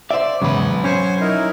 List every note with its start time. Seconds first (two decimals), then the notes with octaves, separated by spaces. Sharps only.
0.11 C5 D5 E5
0.42 E2 G#2 C#3 F#3 B4
0.84 C#4 C5 G#5 C#6
1.20 D#4 E4 A#4